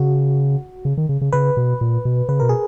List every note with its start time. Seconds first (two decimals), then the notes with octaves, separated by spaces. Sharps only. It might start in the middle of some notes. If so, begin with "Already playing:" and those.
Already playing: C#3 F#4
0.85 C#3
0.97 D#3
1.09 C#3
1.21 C#3
1.32 C#3 B4
1.57 B2
1.81 A#2
2.05 B2
2.29 C#3 B4
2.40 B2 A#4
2.49 G#4